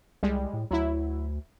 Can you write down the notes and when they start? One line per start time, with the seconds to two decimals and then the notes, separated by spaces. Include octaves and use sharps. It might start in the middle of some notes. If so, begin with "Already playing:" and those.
0.23 C2 G3 G#3
0.53 A2
0.71 D2 F#3 E4